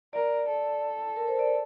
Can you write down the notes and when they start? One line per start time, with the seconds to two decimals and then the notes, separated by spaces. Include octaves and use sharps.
0.13 A#4 D5
0.47 A4
1.16 A#4
1.28 C5
1.39 D5